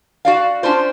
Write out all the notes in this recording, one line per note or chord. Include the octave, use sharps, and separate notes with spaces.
F#4 D5 F5
C#4 D4 F4 C5